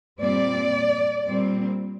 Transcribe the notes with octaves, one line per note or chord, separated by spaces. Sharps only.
A#2 G3 C4 D5
A#2 G3 C4